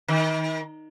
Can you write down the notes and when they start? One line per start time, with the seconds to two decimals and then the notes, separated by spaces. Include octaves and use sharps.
0.08 D#3